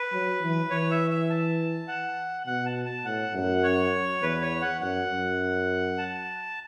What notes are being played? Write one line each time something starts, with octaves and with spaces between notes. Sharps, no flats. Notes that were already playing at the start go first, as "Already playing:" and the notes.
Already playing: B4
F#3
E3
E3 C#5
E5
E5
A5
F#5
B2 F#5
A5
A5
A2 F#5
F#2
C#5
E2 B4
C#5
F#5
F#2 F#5
F#2
A5